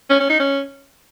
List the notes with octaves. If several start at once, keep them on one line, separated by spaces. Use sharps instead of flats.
C#4
C#4
D#4
C#4